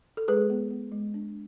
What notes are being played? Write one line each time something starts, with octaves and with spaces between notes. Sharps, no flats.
A4
G#3 G#4 B4
B3
B3
G#3
D4